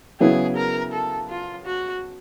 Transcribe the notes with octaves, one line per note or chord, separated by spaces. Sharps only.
C#3 F#3 B3 E4 G#4
A#4
A4
F4
F#4